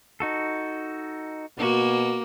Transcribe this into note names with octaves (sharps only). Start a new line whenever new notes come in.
D#4 F#4 A4
B2 A#3 F#4